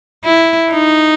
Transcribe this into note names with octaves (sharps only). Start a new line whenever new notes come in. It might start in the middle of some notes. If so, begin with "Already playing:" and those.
E4
D#4